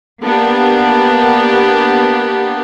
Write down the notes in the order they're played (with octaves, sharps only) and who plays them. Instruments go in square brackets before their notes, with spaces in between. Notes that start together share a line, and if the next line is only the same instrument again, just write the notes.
[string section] A#3 B3 D4 G4